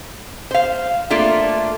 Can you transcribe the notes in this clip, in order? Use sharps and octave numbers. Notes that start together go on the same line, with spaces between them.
C5 F5
A3 A#3 D4 F4